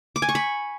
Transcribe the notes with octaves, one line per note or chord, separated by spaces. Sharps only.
D6
G#5
C#6
B5